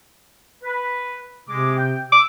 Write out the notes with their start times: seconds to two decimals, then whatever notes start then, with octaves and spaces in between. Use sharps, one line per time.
0.63 B4
1.49 C3 G#3 D6
1.77 G5
2.12 D6 E6